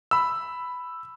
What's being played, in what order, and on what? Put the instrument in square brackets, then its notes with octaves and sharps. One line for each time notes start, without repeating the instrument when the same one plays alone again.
[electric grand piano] B5 E6